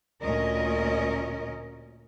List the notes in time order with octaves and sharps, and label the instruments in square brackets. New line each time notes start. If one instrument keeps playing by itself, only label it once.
[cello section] D2 A#2 C#4 A#4 D#5